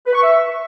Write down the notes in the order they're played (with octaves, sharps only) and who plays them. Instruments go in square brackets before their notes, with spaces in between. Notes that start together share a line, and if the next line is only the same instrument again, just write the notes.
[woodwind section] B4
C#6
E5